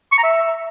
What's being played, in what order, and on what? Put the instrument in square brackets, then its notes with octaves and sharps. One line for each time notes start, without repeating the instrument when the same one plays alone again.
[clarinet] C#6
A#5
E5